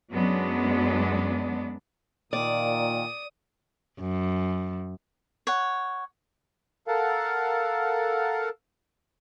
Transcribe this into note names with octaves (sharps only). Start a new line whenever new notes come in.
F#2 F#3 G#3 B3 D4
A#2 D#3 D5 D#6
F#2
C#5 F#5
A4 A#4 F5 F#5 A5